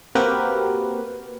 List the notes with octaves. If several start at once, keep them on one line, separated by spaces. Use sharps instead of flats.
A#3 C4 F#4 G4 A#4 B4